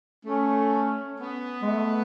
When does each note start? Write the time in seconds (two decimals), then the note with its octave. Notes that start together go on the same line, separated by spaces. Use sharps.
0.25 A3 C#4
1.21 B3
1.62 G#3
1.69 A3